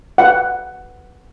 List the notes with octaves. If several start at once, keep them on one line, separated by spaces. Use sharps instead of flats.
F#5